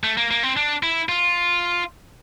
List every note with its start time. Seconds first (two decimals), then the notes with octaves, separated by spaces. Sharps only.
0.04 A3
0.17 A#3
0.31 A#3
0.43 C4
0.57 D4
0.83 E4
1.09 F4